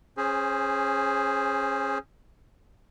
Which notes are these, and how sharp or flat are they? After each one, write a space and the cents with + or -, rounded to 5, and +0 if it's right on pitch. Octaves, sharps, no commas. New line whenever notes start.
C#4 -25 G#4 +0 C5 +0